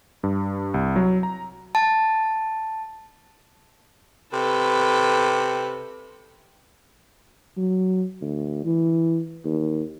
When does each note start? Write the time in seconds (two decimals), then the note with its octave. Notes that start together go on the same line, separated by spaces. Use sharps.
0.23 G2
0.74 C2
0.96 F#3
1.23 A#5
1.75 A5
4.33 C3 A4 B4
7.57 F#3
8.21 D2
8.65 E3
9.45 D#2